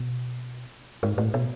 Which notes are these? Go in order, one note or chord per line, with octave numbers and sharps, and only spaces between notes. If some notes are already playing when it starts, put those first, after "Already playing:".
Already playing: B2
G#2
A2
B2